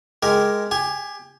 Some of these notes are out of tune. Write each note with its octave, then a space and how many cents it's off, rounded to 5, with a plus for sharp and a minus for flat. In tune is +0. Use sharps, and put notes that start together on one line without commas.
G#3 +0 G4 +0 A#4 +0
G4 +25 G#5 +0